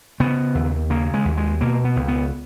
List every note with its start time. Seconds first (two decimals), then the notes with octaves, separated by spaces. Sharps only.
0.20 C#3 B3
0.55 D#2
0.90 C#3 A#3
1.14 G#3
1.25 D#2
1.37 G#3
1.61 B2 A#3
1.85 B3
1.96 C#2
2.08 B3